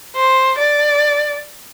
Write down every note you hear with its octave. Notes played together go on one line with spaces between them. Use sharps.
C5
D5